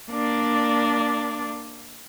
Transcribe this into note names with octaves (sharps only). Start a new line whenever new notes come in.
A#3 D4 D5